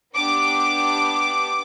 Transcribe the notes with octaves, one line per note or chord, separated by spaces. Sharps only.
B3 D4 G4 D6